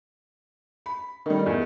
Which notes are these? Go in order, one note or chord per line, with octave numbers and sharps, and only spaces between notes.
B5
D#3 G3 A4 A#4 D#5
E2